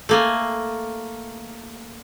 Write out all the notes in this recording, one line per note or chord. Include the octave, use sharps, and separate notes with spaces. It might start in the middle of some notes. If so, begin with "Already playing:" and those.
A3 A#3 G#5